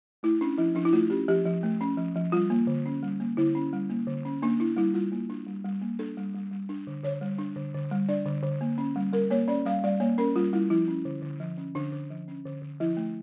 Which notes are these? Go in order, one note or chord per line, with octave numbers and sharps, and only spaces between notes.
A3 E4
C#4 D4
F3 E4
F3 D4
E4
A3 F4
C#4 G4
F3 G4
F3
A3
C#4
F3
F3
G3 F4
A#3
D3
C#4
G3
A#3
D3 E4
C#4
G3
A#3
D3
C#4
A#3 D4
D4 E4
G3 E4
G3 F4
A#3
D4
G3
G3
A#3
D4 A4
G3
G3
G3
D4
D3
D3 C#5
G3
D4
D3
D3
G3
D4 D5
D3
D3
A#3
C#4
G3
G3 A#4
A#3 C#5
C#4 D5
G3 F5
G3 D5
A#3 C#5
C#4 A#4
G3 F4
G3 E4
F3 E4
C#4
D3
D3
F3
C#4
D3 D4
D3
F3
C#4
D3
D3
F3 E4
A3